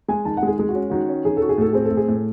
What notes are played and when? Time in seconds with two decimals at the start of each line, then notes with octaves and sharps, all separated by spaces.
0.08 G#3 G#5
0.25 D#3 A5
0.37 F#5
0.43 G#3 G#4
0.58 G#3 G#4
0.69 F#4
0.75 C#4
0.90 D#3 F#4
1.09 C#4
1.25 D#3 G#4
1.37 F#4 A4
1.49 G#4
1.58 A2 A4
1.73 C4 G#4
1.85 A4
1.91 A2
1.97 G#4
2.08 A2